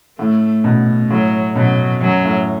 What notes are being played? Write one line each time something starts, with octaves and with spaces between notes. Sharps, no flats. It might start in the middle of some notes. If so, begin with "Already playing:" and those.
A2 A3
B2
A2 F#3
B2 F#3
F#2 F#3
A2